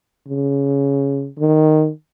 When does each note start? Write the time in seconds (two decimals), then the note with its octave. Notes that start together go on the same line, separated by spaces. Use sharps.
0.28 C#3
1.39 D#3